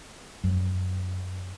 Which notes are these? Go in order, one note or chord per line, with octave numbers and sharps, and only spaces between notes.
F#2